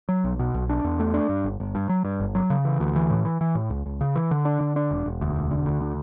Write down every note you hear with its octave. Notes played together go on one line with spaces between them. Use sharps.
F#3
B1
B2
B1
D4
E2
A3
D4
G2
G1
G1
G2
F#3
G2
G1
F#3
C#3
E3
D2
E3
A2
E3
E3
A2
C#2
C#2
C#3
E3
D3
D4
D3
D4
E1
E1
D2
E1
D3
D2
D3